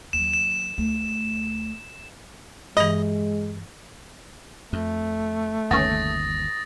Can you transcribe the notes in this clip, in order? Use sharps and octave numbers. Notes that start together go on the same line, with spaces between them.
D#2 F#3 E7
E7
D2 A3
G2 E3 G#3 D#5
F2 A3
G1 D#2 C#3 B3 C#4 D#6 A6 A#6